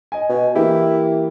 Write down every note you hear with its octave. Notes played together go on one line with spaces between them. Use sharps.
D#5 G#5
B2
E3 A#3 E4 G4